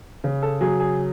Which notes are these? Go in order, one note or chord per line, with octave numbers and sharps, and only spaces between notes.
C#3
A4
F#3 G#4
G#4